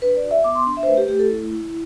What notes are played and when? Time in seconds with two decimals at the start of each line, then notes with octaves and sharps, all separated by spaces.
0.02 D4 B4
0.17 D5
0.23 F#4
0.31 E5
0.44 B3 D6
0.55 C6
0.66 D4
0.77 E5
0.83 C5
0.87 A3 B4
0.97 G4
1.08 A3 G4
1.19 A4
1.29 E4
1.51 E4